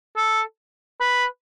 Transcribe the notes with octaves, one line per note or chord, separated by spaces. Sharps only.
A4
B4